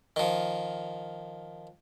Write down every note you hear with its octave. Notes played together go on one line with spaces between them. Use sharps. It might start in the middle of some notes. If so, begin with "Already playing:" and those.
D#3 F3